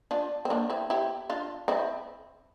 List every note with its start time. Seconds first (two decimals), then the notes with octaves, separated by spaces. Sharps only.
0.11 D4 F4
0.45 C4
0.50 A#3 D4
0.70 C4 E4
0.90 E4 G4
1.30 D4 F4
1.68 C4 E4